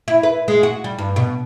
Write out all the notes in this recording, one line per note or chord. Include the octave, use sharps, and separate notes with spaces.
E4
B4
G#3
F#4
G3
G2
B2